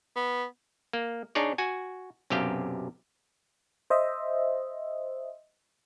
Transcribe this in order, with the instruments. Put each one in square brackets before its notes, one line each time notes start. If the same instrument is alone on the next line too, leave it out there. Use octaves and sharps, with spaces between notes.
[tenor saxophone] B3
[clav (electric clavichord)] A#3
D4 D#4 G#4 C#5 D5
F#4 G#5
B1 F#2 C3 G4 F5 G5
[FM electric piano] C5 D#5 E5